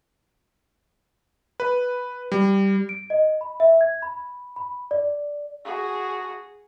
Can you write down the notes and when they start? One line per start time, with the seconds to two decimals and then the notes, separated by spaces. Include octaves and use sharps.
1.60 B4
2.32 G3
2.89 D7
3.10 D#5
3.41 B5
3.60 E5
3.81 G#6
4.02 B5
4.56 B5
4.91 D5
5.65 F#4 G#4